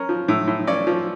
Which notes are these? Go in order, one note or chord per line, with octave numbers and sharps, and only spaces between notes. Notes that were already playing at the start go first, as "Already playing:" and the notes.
Already playing: C#4 A#4
F3
A2
A2
C#4 D5
F3